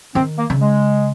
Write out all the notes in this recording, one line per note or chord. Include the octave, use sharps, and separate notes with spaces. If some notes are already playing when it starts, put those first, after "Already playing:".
D#3 C4
A#3
C#3
G#3